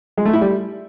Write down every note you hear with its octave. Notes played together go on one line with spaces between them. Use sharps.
G#3
A3
E4
G3